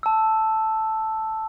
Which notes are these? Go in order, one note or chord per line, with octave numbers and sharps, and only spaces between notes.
A5 E6